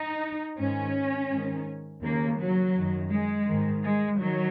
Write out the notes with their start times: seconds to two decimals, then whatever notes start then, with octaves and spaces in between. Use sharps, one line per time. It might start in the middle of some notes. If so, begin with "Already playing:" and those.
Already playing: D#4
0.58 G#2 D#3 C#4
1.30 G#2 D#3
2.02 D#2 C#3 A#3
2.38 F#3
2.75 F#2 D#3
3.11 G#3
3.47 G#2 D#3
3.83 G#3
4.19 D#3 F#3